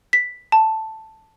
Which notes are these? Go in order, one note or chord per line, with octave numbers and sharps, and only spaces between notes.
B6
A5